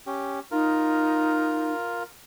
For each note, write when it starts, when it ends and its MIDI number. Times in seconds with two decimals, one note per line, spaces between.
0.07 0.39 61
0.07 0.39 67
0.51 1.72 63
0.51 2.03 65
0.51 2.03 70